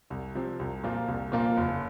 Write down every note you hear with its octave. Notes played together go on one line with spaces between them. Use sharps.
C2
C3 F3 C4
C2
A#2 F3 A#3 F4
C2
A#2 F3 A#3 F4
F#1